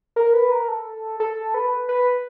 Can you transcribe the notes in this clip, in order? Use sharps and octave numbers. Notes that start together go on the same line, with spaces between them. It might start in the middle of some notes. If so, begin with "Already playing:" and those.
A#4
B4
A#4
A4
A4
B4
B4